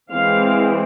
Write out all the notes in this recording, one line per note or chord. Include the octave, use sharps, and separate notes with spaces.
E3 G#3 C4 F5